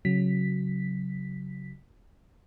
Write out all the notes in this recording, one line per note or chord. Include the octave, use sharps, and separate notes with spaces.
C#3 F#3 B6